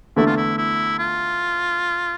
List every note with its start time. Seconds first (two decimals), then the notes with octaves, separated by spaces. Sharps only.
0.16 E2 D3 A3 E4
0.26 F4
0.37 E4
0.57 E4
0.98 F4